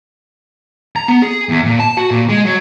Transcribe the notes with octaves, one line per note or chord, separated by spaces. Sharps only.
A#5
B3
G#4
E2
A#2
A5
F#4
A#2
G#3
F#3